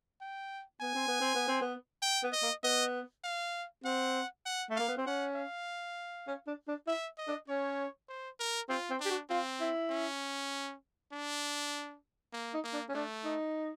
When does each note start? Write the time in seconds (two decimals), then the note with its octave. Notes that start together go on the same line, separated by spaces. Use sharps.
0.21 G5
0.81 B3 G#5
0.95 C4
1.08 B3
1.21 C4
1.35 B3
1.48 C4
1.61 B3
2.02 G5
2.23 B3
2.32 D#5
2.43 A#3
2.64 B3 D#5
3.24 F5
3.84 C4 F#5
4.45 F#5
4.70 A3
4.76 A#3 F5
4.88 B3
4.97 C4
5.06 C#4 F#5
5.35 F5
6.27 C#4
6.47 D4
6.68 D4
6.87 E4 E5
7.18 D#5
7.28 D4
7.48 C#4 C#5
8.08 C5
8.39 A#4
8.69 C4 F4
8.90 C4
9.00 D4
9.05 G4
9.10 F#4
9.30 C4 F4
9.60 E4
9.90 C#4
11.12 D4
12.33 A#3
12.54 D#4
12.64 A#3
12.73 D4
12.89 C#4
12.94 A3 D4
13.24 D#4